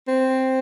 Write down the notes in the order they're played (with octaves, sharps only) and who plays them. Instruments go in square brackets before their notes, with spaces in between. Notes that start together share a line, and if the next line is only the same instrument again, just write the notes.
[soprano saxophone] C4